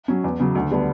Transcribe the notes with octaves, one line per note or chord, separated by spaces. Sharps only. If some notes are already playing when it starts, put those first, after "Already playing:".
F#3 C#4
E2
C#3 F#3
D2
D3 G3 B3